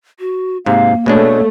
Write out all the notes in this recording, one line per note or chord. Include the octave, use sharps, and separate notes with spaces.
F#4
G#2 C3 A#3 F5
B2 G#3 A3 D4 C#5